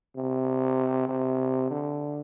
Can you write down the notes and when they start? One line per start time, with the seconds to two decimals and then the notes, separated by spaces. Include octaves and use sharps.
0.16 C3
1.08 C3
1.71 D3